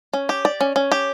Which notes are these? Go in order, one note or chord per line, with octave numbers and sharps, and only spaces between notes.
C#4
G4
D5
C#4
C#4
G4